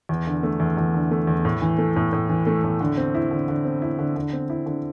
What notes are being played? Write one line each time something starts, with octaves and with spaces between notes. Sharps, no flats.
E2
D3
A3
E2
E2
D3
A3
E2
A2
E3
A3
A2
A2
E3
A3
A2
D3
C4
E4
D3
D3
C4
E4
D3
D3
C4
E4
D3